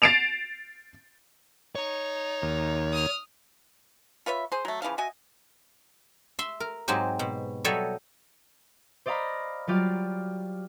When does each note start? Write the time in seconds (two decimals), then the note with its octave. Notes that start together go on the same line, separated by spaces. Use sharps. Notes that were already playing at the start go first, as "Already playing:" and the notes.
0.02 A6 C7 D7 E7 F7
1.75 D#4 C#5
2.42 D#2
2.92 D#6 F6
4.26 F4 B4 C#5 E5
4.52 G#4 C5
4.65 F#3 A3
4.82 C#3 E3 F3 F5
4.98 F#4 D#5 E5 G#5
6.39 E5 C6
6.60 A#4
6.88 G#2 F#3 G#3 C4 G4
7.19 B2
7.64 F#3 G3 A4 C#5 D#5 E5
9.06 C5 D5 D#5 F5 A#5 B5
9.67 F#3 G3 F4 G4 D5 F5